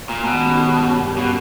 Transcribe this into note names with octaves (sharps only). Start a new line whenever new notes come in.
A#2
B2 D#3 G#3 C#4 G4
G2 G3 A#3 C#4 G4
B2